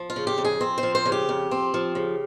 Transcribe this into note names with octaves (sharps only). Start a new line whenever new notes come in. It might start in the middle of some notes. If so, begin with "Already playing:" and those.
Already playing: F3
F4
C#3
G4
F2
G#4
C4
C5
F3
C5
C#3
G4
F2
C4
F3
C#3